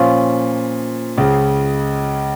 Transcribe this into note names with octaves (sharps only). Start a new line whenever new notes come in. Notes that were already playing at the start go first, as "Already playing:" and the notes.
Already playing: A#2 F3 C#4 F4
C#2 C#3